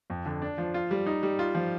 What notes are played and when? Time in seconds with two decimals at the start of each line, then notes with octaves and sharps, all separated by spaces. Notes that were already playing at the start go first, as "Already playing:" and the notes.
0.10 F2
0.26 D3
0.42 D4
0.58 F3
0.74 F4
0.91 G3
1.06 D#4
1.23 G3
1.39 F4
1.55 F3